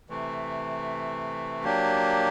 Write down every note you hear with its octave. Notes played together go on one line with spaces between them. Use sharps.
C3 E3 A3
F#3 A#3 D4 G4